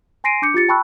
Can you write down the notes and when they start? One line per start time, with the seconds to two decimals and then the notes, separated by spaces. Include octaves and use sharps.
0.24 G#5 C6 A#6 C7 D7 D#7
0.42 D4 D6 G6 C#7
0.54 F4 G4 A6 C#7
0.69 G5 A5 B5 C#6 E6 F#6